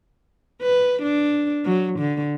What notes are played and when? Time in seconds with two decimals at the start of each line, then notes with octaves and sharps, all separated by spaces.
0.62 B4
1.02 D4
1.65 F#3
1.99 D3